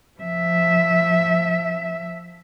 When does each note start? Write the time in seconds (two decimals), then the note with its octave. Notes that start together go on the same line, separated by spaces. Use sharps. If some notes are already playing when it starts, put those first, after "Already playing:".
0.20 F3 E5